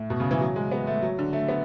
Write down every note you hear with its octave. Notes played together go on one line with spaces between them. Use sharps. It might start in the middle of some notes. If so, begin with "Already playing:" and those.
Already playing: A2
B2
C#3
E3
F#3
G#3
B3
A3
F#3
D3
A3
B3